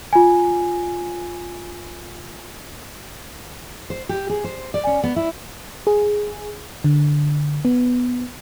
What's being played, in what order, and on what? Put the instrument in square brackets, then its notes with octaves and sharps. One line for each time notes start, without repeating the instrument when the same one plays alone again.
[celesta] F4 G#5
[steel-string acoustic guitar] C5
G4
G#4
C5
D5
C#4
B3
E4
[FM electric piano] G#4
D3
B3